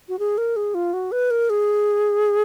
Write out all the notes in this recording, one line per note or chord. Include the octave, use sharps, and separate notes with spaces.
F#4
G#4
A#4
G#4
F4
F#4
B4
A#4
G#4